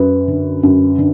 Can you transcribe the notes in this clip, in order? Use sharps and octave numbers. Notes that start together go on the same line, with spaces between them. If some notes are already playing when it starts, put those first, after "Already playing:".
Already playing: F#2 B4
D3
F#2
D3